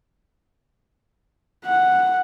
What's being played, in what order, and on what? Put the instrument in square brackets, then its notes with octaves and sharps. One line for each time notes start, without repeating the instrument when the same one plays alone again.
[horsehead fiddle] F#5